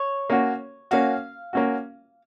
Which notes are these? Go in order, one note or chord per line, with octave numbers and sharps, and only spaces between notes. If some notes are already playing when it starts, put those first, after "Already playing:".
Already playing: C#5
A#3 C#4 F#4
A#3 C#4 F#4 F5
A#3 C#4 F#4